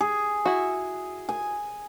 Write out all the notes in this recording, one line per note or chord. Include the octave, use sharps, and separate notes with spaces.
G#4
E4 F#4
G#5